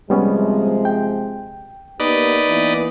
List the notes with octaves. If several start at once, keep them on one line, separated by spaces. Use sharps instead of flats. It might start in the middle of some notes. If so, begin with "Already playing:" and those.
C3 F3 G3 G#3 B3 C#4
G5
A#3 B3 D#4 G4 B4 D5
E3 A#3 B3